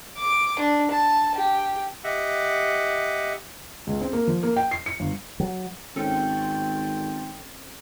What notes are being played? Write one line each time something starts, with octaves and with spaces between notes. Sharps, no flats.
D6
D4
A5
G4
G4 D#5 E5 F#5
C#2
C4
A#3
F3
A#3
G5
C7
C#7
G1
F#3
G#1 C4 C#4 A4 G5